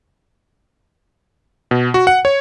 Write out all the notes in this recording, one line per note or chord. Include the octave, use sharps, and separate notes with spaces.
B2
F#4
F#5
C#5